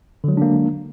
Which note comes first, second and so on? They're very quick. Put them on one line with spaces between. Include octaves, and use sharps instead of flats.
D3 F#3 G#3 D4 A#3